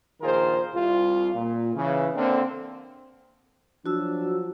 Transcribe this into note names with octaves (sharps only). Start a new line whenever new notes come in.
A#1 D#3 F4 G#4 A#4 C5
C2 F4
A#2
C#3 E3
D3 A#3 C4
F3 F#3 D4 F#4 E6